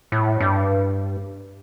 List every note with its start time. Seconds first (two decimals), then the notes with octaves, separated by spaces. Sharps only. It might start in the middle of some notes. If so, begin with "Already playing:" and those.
0.12 A2
0.40 G2